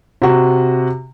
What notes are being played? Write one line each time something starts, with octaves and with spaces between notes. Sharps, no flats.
C3 F#4